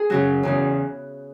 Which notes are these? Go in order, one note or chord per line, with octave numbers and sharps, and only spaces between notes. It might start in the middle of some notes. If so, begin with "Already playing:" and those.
Already playing: G#4
F#2 C#3 F#3 F#4
E2 C#3 E3